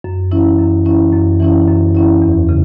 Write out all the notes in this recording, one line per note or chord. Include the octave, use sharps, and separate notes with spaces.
F#2
E3 C#4 E4
F#2
E3 C#4 E4
F#2
E3 C#4 E4
F#2
E3 C#4 E4
E2
C#3